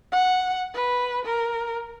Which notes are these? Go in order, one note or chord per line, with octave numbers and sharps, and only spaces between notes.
F#5
B4
A#4